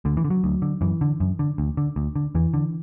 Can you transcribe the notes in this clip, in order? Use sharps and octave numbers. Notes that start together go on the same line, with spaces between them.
D2 D3
E3
D3
F#3
D2
D3
F#2 E3
D3
F#2
D3
D2
D3
D2
D3
E2 E3
D3